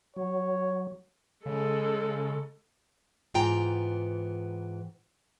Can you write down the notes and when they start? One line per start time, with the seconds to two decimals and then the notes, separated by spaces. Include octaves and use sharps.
0.16 F#3 C#5
1.45 C#3 G#3 A4
3.34 G#2 E3 B3 F4 G5 A#5